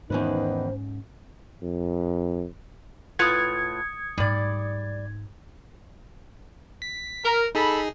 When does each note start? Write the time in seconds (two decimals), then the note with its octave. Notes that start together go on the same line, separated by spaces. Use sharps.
0.10 E2 G#2 D#3 C#4 D#4 B4 C5
1.63 F2
3.19 A2 F4 B4 D#6 G#6 C#7
4.18 G#2 G3 A3 D5
6.82 B6
7.25 A#4
7.55 D#4 G#4 A4 B5